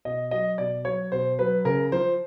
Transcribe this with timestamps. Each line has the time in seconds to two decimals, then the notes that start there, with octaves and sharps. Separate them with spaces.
0.05 B2 D#5
0.31 F#3 D#5
0.58 B2 D5
0.85 F#3 C#5
1.12 B2 C5
1.39 F#3 B4
1.65 C#3 A#4
1.92 F3 C5